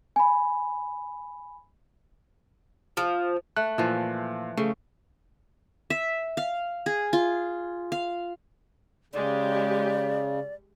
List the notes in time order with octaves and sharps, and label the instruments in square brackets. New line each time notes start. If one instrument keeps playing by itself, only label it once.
[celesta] G#5 B5
[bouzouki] F3
[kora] A3 [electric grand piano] F#6
[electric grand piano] A#2 [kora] E3 F3
[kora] C#3 [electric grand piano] A3
[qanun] E5
F5
G#4
F4
F5
[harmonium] C#3 [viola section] G#3 G4 [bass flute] D5